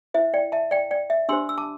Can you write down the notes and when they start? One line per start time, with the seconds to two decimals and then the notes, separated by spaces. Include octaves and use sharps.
0.14 E4 C5 E5
0.34 D5 G5
0.52 E5 A5
0.71 D5 G5
0.91 D5 G5
1.10 E5
1.29 D4 G4 C5 C6 E6
1.49 E6
1.58 A5 D6